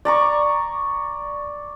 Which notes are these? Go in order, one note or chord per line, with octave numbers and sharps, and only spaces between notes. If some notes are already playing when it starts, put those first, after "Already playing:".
D5 A#5 C#6